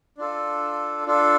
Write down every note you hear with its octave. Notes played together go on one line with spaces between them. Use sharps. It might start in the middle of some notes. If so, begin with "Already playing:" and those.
D4 F4 A4
D4 F4 A4